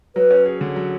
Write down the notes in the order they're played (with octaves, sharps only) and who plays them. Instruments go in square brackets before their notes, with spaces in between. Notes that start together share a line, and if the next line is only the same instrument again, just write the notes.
[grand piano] F#3 [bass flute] B4
[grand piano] C#4
G#4
D3
F#3